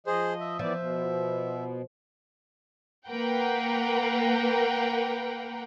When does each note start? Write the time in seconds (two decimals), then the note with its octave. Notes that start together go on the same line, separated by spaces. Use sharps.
0.07 F3 G#4 C5 D#5
0.40 E5
0.59 E3 F3 B3 D5
0.78 B2
3.07 A#3 A#4 B4 F#5 G5